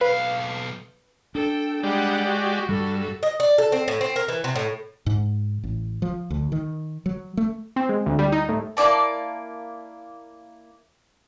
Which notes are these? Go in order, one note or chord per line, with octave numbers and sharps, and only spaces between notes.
B1 B4 F5
D4 A4 G5
G3 G#3 G4 D5 F#5
F#4
G2 G3 F#4 A4
D#5
D5
A4
C4
A2
C4
A#4
E3
C3
A2
G#2
A1
F3
D2
D#3
F#3
A3
C4
G#3
D2
G3
D#4
A2
A#3 E4 D5 A5